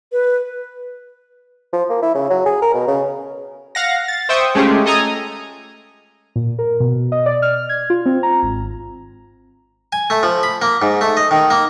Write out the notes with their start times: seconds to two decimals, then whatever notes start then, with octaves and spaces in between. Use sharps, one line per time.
0.12 B4
1.73 F3
1.90 A#3
2.03 E4
2.15 C#3
2.30 F#3
2.46 G#4
2.62 A#4
2.74 B2
2.88 C#3
3.75 F5 F#5 A#6
4.08 A6
4.29 C5 E5 G5 C#6 D#6
4.55 G#3 A3 C#4 F4 G4 G#4
4.86 A4 D#5 G#5 A#5 D#6
6.36 A#2
6.59 A#4
6.80 B2
7.12 D#5
7.26 D5
7.42 F6
7.69 G#6
7.90 F4
8.06 C4
8.23 A#5
8.43 G#1
9.93 G#5
10.10 A3
10.23 F3
10.43 B5
10.62 A#3
10.82 G#2
11.01 A3
11.17 D#5
11.31 D#3
11.50 A#3